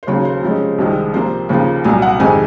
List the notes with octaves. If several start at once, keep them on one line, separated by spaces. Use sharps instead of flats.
C5
D#2 C#3 F#3 C#5
C5
C3 F3 G#3 C#4
C2 C3 D#3 G#3
C3 F3 A#3 C5
D#2 C#3 F3 A#3 F4
C2 A#2 F#3 G#5
F#5
F2 C3 D#3 G#3 G#5